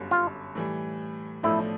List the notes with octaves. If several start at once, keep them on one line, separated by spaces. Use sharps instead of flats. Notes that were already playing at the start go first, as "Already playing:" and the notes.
Already playing: G1 F#2 D3 G3
F4
A2 E3 G3
B1 A2 F3 A3 D4 E4